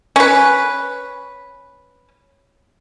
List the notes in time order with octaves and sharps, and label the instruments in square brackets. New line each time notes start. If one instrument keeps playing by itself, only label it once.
[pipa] C#4 B4